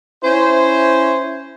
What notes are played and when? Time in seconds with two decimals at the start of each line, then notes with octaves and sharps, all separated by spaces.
0.23 C#4 E4 C5